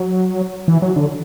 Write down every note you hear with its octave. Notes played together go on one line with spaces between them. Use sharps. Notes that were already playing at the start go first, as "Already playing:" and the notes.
Already playing: F#3
E3
F#3
D3